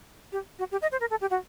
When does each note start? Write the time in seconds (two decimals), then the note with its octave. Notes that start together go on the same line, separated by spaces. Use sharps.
0.32 G4
0.59 F#4
0.71 G4
0.82 D#5
0.92 C5
1.00 A#4
1.10 A4
1.21 G4
1.30 F#4